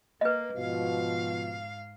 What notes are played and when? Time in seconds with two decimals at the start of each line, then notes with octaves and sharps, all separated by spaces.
0.21 A#3 B4 D#5
0.56 G#2 B2 F3 F5